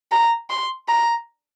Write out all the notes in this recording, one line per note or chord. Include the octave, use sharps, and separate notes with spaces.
A#5
C6
A#5